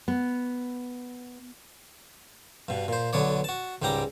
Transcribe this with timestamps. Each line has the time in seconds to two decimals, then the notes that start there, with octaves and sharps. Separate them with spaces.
0.08 B3
2.69 G2 B2
2.88 A#2 C5
3.13 B1 D3 B3 C#5 D5
3.44 F#4 A5
3.82 C#2 G#2 G3 G5 A#5 D6